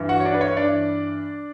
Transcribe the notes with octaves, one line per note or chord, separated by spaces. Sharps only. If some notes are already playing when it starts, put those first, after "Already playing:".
Already playing: G2 E3
F#4 F#5
C#5
D4 D5
B4
C#5
G2 E3 D4 D5